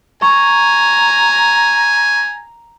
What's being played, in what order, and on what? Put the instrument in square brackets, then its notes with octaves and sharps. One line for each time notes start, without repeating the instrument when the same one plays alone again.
[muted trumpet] G#5 [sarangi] A#5 [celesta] C#6